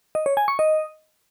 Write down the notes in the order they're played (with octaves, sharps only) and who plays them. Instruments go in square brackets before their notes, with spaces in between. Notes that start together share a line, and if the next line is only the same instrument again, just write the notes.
[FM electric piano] D#5
C#5
G#5
C#6
D#5